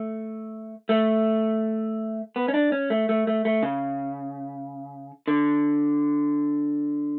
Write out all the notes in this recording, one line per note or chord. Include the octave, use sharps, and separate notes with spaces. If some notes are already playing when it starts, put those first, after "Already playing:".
Already playing: A3
A3
B3
C#4
D4
C#4
A3
A3
A3
A3
C#3
D3